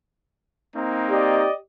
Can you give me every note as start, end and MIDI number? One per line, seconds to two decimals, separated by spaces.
0.76 1.48 58
0.76 1.48 60
0.76 1.48 63
1.10 1.53 67
1.10 1.53 74
1.10 1.53 75